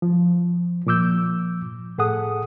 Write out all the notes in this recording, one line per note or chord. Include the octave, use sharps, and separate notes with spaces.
F3
A#2 F3 D6 E6 G6
A2 G#4 A4 F#5 D#6